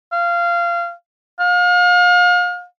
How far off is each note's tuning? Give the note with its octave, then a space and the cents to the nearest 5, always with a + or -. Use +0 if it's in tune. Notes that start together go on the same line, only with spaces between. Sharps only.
F5 -20
F5 +35